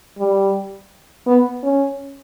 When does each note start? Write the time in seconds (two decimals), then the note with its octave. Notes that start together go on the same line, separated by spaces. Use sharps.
0.19 G3
1.26 B3
1.63 C#4